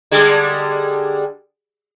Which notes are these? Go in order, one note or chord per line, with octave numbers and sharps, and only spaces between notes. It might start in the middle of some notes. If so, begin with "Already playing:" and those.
D3 G3 G#3